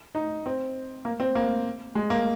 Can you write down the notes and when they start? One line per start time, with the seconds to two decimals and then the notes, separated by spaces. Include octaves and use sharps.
0.15 D#4
0.46 C4
1.05 A#3
1.20 C4
1.35 A#3
1.95 G#3
2.10 A#3